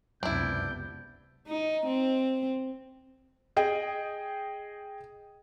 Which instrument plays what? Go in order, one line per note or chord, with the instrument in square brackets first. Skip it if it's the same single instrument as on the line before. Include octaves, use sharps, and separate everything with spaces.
[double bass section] C#2 C3 B3 [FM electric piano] F#2 [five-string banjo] D4 E4 [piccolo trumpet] G6
[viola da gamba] D#4
C4
[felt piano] G#4 D#5 G5